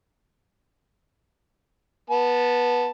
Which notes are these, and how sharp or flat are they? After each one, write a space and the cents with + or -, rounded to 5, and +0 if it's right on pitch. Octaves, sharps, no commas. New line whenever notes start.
B3 -15 A5 +0